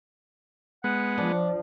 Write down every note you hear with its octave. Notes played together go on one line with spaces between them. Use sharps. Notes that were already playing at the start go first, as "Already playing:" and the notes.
G#3 B3 F#5
F3 D4